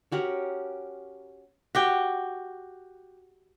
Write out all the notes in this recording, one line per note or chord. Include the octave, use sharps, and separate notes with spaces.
C#4 F#4 G4 A#4
F#4 G4 G5